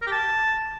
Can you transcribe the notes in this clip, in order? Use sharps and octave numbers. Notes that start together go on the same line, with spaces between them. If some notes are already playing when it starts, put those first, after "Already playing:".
A#4
G4
A5